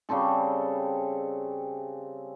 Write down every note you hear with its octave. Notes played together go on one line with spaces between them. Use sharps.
C#3 G3 C4 A4